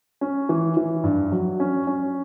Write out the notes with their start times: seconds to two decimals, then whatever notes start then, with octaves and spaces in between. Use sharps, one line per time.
0.21 C#4
0.49 E3
0.77 E3
1.04 G2
1.32 F#3
1.60 C#4
1.87 C#4